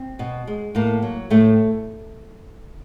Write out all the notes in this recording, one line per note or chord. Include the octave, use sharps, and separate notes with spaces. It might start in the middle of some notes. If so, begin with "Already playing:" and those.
Already playing: C4
B2
G#3
A2 A#3
F#3
A2 A3